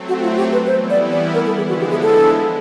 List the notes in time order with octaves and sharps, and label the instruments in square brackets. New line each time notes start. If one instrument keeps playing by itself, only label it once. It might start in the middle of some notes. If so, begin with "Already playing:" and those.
Already playing: [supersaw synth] F#3 A3 C4
[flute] F#4
F4
G4
B4
[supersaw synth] E3 G3 B3 E4 [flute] C5
[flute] D5
D5
A#4
A4
[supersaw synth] D3 F3 G#3 B3 E4 [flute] G#4
[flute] F#4
G4
G#4
A4